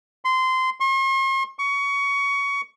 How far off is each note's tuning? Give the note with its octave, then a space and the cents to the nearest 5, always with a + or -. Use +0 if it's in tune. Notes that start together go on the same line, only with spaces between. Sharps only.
C6 -20
C6 +45
C#6 +20